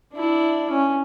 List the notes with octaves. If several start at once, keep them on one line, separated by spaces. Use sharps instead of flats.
D4 E4
C#4